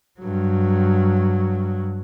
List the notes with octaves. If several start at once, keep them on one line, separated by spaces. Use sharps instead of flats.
G2 F#3